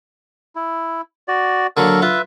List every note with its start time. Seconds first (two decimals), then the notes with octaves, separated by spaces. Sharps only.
0.56 E4
1.28 F#4 D5
1.77 D3 F#3 A#3 A4 A#4
2.02 F4 B4 E5